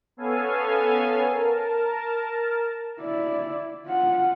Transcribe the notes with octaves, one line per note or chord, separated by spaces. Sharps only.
B3 C#4 A4 F5 G#5
A#4 A5
E4 D5
F4 F#5